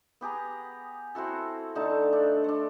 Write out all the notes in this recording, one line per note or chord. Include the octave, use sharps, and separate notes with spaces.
B3 G4 G#4 A#5
C4 E4 F#4 A4
D3 A3 D#4 A5
D4
A3 D4